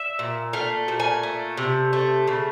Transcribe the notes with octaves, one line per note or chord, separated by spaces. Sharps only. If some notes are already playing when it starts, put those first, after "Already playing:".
Already playing: E5
A#2
A3 F5
A#2
G#5
A3
C3
A3
C#3